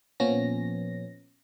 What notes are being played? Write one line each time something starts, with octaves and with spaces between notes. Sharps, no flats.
A#2 F3 B3 C#4 A#6